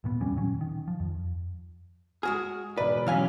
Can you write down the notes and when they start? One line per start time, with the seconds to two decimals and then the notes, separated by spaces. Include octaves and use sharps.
0.04 D#1 A#2 B3
0.20 F1 F2 G3 C#4
0.36 A#2 D#3 F#3 C#4
0.61 D#3
0.88 F3
1.00 F2
2.23 G#3 F#4 G#4 D#6 F6
2.77 E1 B4 D5
3.07 G#2 E3 F#3 C#4 F5 G#5